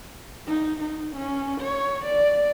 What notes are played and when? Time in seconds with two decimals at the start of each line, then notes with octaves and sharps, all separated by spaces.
0.47 D#4
0.80 D#4
1.16 C#4
1.62 C#5
2.05 D5